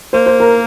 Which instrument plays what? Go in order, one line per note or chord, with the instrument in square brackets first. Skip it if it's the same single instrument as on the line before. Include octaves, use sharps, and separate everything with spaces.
[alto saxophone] A#3 [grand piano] C5
[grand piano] C5
A#4